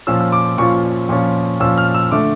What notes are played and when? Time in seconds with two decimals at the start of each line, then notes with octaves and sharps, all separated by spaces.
0.07 A#2 F3 C#4 F4 E6
0.20 E6
0.32 D6
0.58 A#2 F3 C#4 F4 C#6
1.09 A#2 F3 C#4 F4
1.60 A#2 F3 C#4 F4 E6
1.78 F6
1.94 E6
2.12 D3 A3 D6